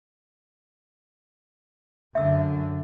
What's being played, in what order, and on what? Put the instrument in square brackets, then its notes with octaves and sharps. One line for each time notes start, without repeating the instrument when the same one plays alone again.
[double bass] F#2 D3 [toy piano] E5 E6